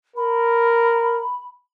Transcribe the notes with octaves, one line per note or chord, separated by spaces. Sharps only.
A#4 B5